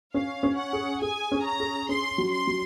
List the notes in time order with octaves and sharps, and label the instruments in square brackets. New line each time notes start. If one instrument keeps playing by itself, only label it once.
[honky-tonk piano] C#4 [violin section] F5
[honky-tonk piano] C#4
[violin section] F#5
[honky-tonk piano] G#4
[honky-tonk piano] G#4 [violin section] G#5
[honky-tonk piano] C#4
[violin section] A#5
[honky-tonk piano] G#4
[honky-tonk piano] C#4 [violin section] C6
[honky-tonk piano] F#3
[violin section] C6
[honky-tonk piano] F#3